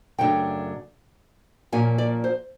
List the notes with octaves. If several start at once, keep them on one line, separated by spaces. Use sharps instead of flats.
F#2 C#3 F#3 A3 D4 G5
A#2 F3 A#3 C#4 G#5
D5
C5